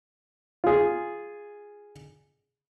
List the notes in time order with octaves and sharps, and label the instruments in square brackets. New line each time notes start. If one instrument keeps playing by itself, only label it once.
[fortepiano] F4 G#4